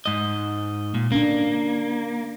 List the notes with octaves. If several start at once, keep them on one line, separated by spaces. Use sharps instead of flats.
G#2 D#5
A#2
A#3 C#4 D4